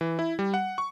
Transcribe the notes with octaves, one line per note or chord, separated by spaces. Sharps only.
E3
E4
G3
F#5
C#6